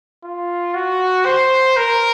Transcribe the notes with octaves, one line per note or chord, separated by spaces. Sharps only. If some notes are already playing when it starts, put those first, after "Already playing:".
F4
F#4
C5
A#4